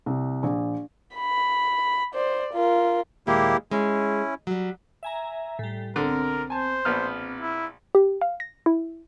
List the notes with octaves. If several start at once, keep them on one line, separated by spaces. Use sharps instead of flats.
C2
A#1
B5
C5 D5
F4 A#4
D#2 A#2 G#3 A#3 E4 G4
G#3 C#4 E4
F#3 G3
E5 G#5 A#5
A2 G3
B1 D3 C4 A#4
C5 G#5 A5
A#1 B3 F6
E4
G4
F5
A#6
E4